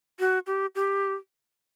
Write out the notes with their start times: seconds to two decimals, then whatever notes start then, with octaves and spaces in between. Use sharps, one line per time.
0.19 F#4
0.47 G4
0.75 G4